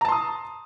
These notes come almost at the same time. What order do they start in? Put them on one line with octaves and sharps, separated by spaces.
A#5 A5 C6 D#6